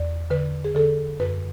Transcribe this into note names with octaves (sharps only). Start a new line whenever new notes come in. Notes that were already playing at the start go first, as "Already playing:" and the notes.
Already playing: E2 D5
D3 B4
G#4
D3 A4
F#2 B4